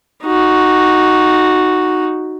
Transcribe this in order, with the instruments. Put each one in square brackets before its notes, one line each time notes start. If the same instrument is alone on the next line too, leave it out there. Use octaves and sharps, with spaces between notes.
[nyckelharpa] D#4 F#4